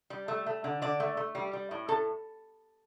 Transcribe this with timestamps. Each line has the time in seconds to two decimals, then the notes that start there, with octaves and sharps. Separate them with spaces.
0.10 G3
0.28 A3
0.46 A3
0.64 D3
0.82 D3 D5
1.00 A3
1.17 A3
1.35 G3
1.53 G3
1.71 A2
1.89 A2 A4